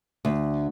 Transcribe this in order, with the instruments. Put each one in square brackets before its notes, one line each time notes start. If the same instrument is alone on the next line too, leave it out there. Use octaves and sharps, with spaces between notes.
[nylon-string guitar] D2